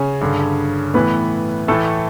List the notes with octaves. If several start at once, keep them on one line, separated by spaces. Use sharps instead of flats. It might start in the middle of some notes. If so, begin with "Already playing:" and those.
Already playing: C#3 C#4
G2 D3
A2 E3 B3 B4
A2 E3 A3 A4